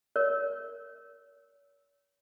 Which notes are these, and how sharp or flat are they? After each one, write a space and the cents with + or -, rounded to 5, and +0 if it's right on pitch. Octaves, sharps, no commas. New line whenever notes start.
A#4 +0 C#5 +40